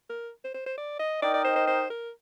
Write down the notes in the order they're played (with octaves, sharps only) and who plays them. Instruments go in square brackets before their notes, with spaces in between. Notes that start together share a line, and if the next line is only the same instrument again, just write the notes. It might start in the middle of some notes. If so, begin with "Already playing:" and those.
[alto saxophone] A#4
C5
C5
C5
D5
D#5
[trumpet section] D#4 A#4 D#5 G5 [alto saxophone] D5
[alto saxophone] D5
C5
C5
C5
A#4